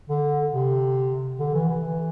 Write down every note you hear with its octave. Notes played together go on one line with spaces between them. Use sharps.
D3
C3
D3
E3
E3